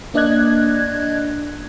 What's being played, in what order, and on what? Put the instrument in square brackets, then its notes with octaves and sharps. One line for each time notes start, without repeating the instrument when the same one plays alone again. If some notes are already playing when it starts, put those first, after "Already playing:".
[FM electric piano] A#3 D4 D5 D#5 F#6 G#6